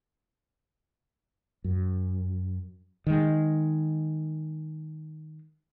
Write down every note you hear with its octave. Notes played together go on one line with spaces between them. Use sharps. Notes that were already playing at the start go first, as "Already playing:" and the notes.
F#2
D#3 G#3